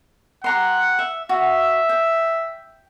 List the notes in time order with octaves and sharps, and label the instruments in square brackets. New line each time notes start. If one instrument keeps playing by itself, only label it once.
[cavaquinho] G4 A#5 C6 [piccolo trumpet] F#5
[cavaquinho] E5
[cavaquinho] F#4 [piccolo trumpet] E5
[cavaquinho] G5